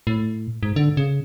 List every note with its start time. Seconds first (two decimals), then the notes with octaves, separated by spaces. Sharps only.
0.07 A2
0.63 G#2
0.76 D3
0.97 C#3